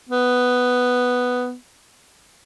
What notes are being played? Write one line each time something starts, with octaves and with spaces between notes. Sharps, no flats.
B3